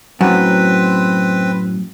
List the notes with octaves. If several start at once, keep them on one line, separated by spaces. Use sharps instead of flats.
F#2 A2 C4 B4